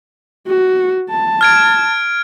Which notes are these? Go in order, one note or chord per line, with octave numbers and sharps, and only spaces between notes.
F#4
A5
F6 G#6 D7